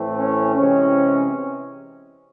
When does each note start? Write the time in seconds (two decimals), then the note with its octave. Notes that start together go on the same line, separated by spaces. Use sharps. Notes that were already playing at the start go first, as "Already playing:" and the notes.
Already playing: A2 E3 A3 C4
0.17 C#4
0.55 C3 E3 G#3 C4 C#4